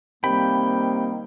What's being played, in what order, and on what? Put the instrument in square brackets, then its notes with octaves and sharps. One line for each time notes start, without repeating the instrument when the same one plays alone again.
[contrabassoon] C3 [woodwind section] D#3 G3 A#3 [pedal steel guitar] G5 B5